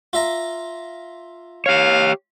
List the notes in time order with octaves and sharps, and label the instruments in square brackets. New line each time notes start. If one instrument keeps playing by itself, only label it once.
[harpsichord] F4 E5 A#5
[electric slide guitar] G4 C#5 [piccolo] F5